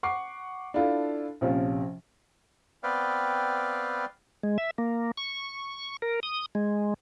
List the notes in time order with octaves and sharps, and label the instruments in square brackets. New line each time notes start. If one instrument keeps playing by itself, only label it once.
[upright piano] F#5 C#6 D6 C7
D4 E4 F4 A4
A#1 C3 F3 C#4
[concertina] B3 C4 B4 D5 F5 G5
[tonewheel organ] G#3
E5
A#3
C#6
A#4
D#6
G#3